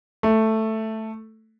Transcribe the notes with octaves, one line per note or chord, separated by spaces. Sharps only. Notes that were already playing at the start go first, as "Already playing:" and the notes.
A3